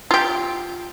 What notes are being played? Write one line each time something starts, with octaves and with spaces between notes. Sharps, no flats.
F4 G4